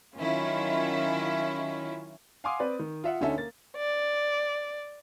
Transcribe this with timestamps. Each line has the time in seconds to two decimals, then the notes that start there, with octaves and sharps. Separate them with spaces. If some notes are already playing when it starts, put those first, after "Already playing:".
0.19 D#3 F#3 C#4 E4 F4
2.44 F5 F#5 G#5 C6 D6 D#6
2.59 C4 B4 D5
2.79 D#3
3.04 F4 E5 F#5
3.21 D2 D3 C#4 D#4 A4 E5
3.37 A#3 A6
3.77 D5